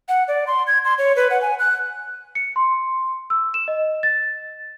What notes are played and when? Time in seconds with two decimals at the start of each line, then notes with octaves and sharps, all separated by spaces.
0.09 F#5
0.28 D5
0.47 C6
0.67 G#6
0.85 C6
0.98 C#5
1.16 B4
1.30 F#5
1.42 G#5
1.59 F#6
2.35 C#7
2.56 C6
3.30 E6
3.54 E7
3.68 D#5
4.03 A6